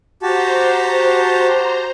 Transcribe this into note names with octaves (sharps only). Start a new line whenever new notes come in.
F#4 G4 C5 A5 A#5